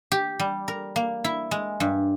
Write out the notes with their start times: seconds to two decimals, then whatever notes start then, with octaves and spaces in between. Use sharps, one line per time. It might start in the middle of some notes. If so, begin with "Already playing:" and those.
0.12 G4
0.39 G3
0.68 A#4
0.96 A#3
1.24 E4
1.51 G#3
1.80 G2